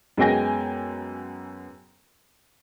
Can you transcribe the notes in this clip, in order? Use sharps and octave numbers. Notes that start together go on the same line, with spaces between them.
F#2 G#3 B3 G5 G#5 A#6